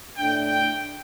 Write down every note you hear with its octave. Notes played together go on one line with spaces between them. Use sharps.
A2 A3 D4 G5
G5